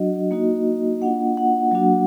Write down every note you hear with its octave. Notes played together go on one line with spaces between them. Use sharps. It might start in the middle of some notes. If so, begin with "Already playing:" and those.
Already playing: F#3 D4 F#4 D#5
A#3 D#4 F#4
A#3 D4 F4 F#5
F#5
F#3 A#3 D4 F#4